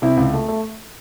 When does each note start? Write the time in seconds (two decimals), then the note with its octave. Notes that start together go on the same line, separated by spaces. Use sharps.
0.02 C3 E4
0.17 C#2
0.33 A3
0.48 A3